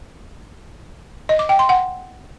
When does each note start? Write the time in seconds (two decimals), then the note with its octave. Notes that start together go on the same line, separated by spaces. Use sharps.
1.29 D#5
1.39 D6
1.49 G5
1.59 C6
1.69 F#5